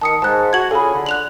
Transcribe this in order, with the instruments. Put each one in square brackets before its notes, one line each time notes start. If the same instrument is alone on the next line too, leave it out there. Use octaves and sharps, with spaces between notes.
[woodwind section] D#3 [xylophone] A5 D#6 C#7
[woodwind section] G#2 [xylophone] A5 F#6
[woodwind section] F#4 [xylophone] G#6 F#7
[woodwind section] C#3 F4 G#4 [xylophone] A4 B5
[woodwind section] D3
[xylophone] F#6 F7 F#7